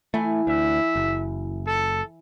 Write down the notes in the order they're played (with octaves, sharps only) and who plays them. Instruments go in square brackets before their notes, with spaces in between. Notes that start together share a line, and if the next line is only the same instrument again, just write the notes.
[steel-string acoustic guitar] E3 E4 G#5 [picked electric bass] A3
[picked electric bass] D2 [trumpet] E5
[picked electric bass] F#1
[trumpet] A4